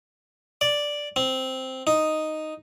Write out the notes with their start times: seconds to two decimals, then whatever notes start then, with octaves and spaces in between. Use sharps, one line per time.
0.61 D5
1.16 C4
1.87 D#4